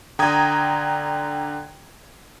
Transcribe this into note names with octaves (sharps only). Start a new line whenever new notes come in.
D3 G5 A#5 D#6 G#6